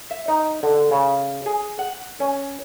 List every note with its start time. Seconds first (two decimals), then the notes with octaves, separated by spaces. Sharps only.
0.11 E5
0.28 D#4
0.63 D3
0.91 C#3
1.46 G#4
1.79 F#5
2.20 C#4